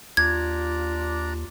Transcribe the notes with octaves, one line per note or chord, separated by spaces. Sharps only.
D#2 D4 F4 D5 A#5 G#6